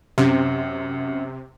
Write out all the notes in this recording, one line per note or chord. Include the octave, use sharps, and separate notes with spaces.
F#2 C3